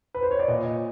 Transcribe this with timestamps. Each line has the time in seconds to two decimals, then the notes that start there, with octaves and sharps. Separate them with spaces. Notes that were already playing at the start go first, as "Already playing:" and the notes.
0.14 B4
0.23 C5
0.31 C#5
0.39 D5
0.48 A#2 D#5